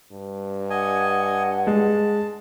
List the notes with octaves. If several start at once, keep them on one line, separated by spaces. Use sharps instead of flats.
G2
D#5 F#5 G#5
G#3 A5